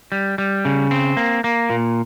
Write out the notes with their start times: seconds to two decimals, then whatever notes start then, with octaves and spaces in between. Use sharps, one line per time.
0.12 G3
0.38 G3
0.65 C#3
0.91 C4
1.17 A#3
1.44 A#3
1.70 A#2